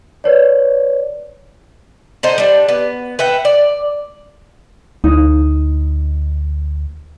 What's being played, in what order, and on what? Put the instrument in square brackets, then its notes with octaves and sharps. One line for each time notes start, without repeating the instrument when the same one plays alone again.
[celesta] B4 C#5 D5
[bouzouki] D3 D#4 C5
G3 D4
B3
B4 E5 F#5 G5
D5
[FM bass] D2 [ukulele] D#4